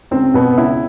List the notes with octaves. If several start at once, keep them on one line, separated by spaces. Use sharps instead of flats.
C#2 C4
B2 B3
C#2 E4